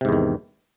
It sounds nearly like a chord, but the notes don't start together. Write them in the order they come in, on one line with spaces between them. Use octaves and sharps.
C3 G#2 E2 D#3